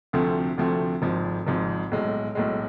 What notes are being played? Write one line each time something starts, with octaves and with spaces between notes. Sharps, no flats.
D2 C3 F3 A3 C4
D2 C3 F3 A3 C4
G#1 G#2 F3
G#1 G#2 F3
B1 A2 G#3
B1 A2 G#3